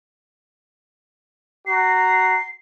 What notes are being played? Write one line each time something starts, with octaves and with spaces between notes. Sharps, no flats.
F#4 A#5 C7